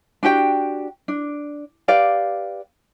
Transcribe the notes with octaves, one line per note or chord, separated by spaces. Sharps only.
D4 F#4 G4 G5
D4
G4 B4 D5 F5